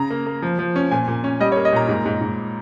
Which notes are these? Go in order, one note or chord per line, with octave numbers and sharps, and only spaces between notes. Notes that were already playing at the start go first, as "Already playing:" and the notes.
Already playing: C#3 A#5
A#3
A#3
F3
F3
C#4
A#2 G#5
A#2
C#4
G3 D#5
C#5
A#3
D#5
A#2 A#5
G#2
G#2
G#2